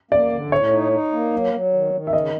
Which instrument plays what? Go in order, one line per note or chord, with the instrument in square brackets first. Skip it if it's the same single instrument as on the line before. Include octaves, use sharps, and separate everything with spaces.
[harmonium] A#3 [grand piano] D5
[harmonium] D3
[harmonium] A2 [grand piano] C#5
[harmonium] D#4
D#4
A#3
F#3
F#3
D#3
D#3
[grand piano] E5
[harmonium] C#3 [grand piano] D#5